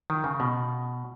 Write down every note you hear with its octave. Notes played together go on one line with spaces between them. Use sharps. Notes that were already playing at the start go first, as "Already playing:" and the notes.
D#3
C#3
B2